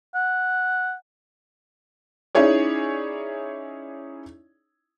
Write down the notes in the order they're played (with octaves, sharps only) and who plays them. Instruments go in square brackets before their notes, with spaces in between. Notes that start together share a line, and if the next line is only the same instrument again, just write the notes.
[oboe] F#5
[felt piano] C#4 D#4 E4 G#4 C#5 D5